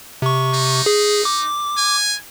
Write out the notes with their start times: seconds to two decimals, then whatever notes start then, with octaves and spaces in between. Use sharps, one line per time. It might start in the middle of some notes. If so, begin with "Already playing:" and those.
0.22 C3 C#6
0.54 D#4
0.86 G#4
1.25 D6
1.78 G#5